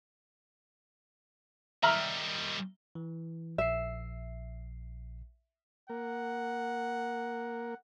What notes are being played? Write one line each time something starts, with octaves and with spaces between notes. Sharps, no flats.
D#3 G3 E5 A#5 F6
E3
A#1 E5 C7
A#3 A#4 F#5